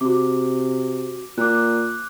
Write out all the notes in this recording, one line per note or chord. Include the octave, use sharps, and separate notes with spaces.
C3 F#4 D6
A#2 D6 F#6